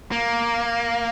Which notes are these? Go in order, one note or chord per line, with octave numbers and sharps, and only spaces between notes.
A#3